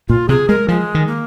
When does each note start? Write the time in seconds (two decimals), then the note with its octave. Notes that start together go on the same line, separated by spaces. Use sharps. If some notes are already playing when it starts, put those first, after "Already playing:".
0.09 A#2 F4
0.29 C3 G#4
0.49 G#3 A#4
0.68 F3 G#3
0.95 D#3
1.08 A#3